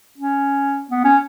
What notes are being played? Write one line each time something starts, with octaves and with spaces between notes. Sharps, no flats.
C#4
B3
C#4